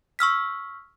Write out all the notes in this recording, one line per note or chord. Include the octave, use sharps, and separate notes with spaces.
C#6 E6 F6 B6